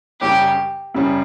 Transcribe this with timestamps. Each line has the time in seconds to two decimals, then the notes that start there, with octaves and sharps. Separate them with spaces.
0.21 F#2 C#3 G3 C#4 G4
0.94 F#2 C#3 G3 C#4